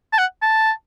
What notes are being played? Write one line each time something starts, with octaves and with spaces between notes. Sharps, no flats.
A5
F#5
A5